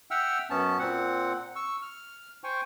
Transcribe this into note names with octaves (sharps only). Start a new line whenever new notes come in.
E5 F#5 G5 E6 F6
F#2 B3 C#4 A5
A#2 C4 F#5
C#6 E6
F6
C5 G5 G#5 C#6